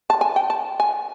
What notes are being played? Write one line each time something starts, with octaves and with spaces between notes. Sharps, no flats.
A5
G#5
G5
A5
G#5